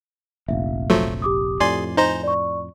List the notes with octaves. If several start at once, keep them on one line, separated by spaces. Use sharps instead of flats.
F1 A#1 E5 F5
F3 F#3 A3
G4 D6 D#6
F2 A2 D5 G#5 C6
D#4 C5 G#5 A#5
D5 C#6